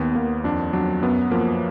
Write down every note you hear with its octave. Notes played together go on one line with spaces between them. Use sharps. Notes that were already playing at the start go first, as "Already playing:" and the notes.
Already playing: D#2 B3
D#2 A#3
F2 D4
F#3 D4
F#2 B3
F3 A#3